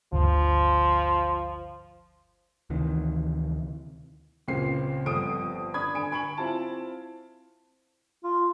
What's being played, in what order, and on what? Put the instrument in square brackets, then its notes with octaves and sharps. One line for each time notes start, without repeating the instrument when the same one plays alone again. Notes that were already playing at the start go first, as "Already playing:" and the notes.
[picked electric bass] G1 D2 [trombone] F3
[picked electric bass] D2 C3 D#3 E3
[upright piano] C#2 A#2 C#3 C4 F4 C7
G1 F2 A4 D#6 D7
D4 B5 D#6 G#6
D3 G#5 D7
G#5 B5 C#6 D7 F#7
C4 E4 F4 A5
[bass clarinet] F4